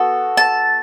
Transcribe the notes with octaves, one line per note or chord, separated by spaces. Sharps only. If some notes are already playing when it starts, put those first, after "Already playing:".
Already playing: B3 F#4 A4
A5